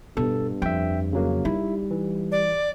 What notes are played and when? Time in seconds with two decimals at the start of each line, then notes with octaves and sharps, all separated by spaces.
0.17 G2 B2 A4
0.62 F2 E5 G5
1.13 C#3 F#3 A#3
1.45 G3 D#4 E4
1.91 E3
2.32 D5